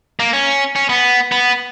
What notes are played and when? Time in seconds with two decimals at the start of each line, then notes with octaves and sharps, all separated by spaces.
0.20 A#3
0.33 C#4
0.76 C#4
0.89 B3
1.32 B3